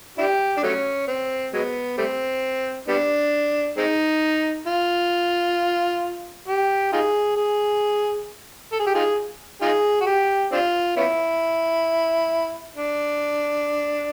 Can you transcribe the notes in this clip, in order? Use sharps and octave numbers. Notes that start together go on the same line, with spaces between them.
D4 E4 G4
D4
F#3 A3 C#4
C4
F#3 G#3 B3
G3 A3 C4
G3 B3 D4
G#3 C4 D#4
F4
G4
D#4 F4 G#4
G#4
A4
G#4
G4
D#4 F4 G#4
D#4 F4 G#4
F#4
G4
C4 D4 F4
B3 C#4 E4
D4